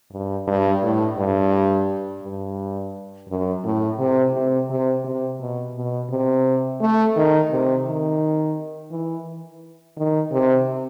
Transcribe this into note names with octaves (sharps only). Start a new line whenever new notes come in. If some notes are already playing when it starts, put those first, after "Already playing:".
G2
G2
A2
G2
G2
F#2
A2
C3
C3
C3
C3
B2
B2
C3
A3
D#3
C3
D#3
E3
D#3
C3